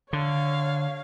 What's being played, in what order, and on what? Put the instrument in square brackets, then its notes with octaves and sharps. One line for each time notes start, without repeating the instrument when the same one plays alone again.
[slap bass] D3 [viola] C#5 F5